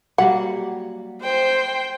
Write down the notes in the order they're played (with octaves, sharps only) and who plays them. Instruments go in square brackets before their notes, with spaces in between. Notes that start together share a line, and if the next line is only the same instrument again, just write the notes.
[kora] F#3 G3 A#3 [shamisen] F#5
[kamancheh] C5 [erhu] G5